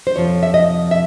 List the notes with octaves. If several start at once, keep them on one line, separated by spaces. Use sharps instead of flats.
C5
F2 C3 F3 C#5
E5
D#5
E5